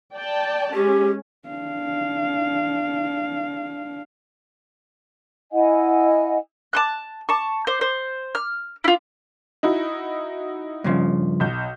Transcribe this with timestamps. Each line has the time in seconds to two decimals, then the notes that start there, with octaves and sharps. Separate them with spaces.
0.14 D5 G5 A5
0.74 G#3 C#4 G4
1.48 D4 F5
5.52 E4 D#5 F#5 G#5
6.73 A5 C6 F#6
7.29 A5 C#6
7.67 C5
7.81 C5
8.35 F6
8.84 E4 F4
9.63 D#4 E4 F#4
10.84 G2 C#3 F3
11.40 B1 G6